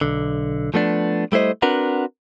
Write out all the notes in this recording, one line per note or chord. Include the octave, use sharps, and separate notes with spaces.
B1 D3
F3 A3 B3 D4
G3 A3 E4 C5 D#5
C4 D4 F#4 A#4 B4 F#5